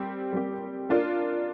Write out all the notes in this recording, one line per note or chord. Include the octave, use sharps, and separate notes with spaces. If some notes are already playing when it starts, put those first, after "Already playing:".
Already playing: G3 C4 G4
G3 C4 G4
A#3 D4 F4 A#4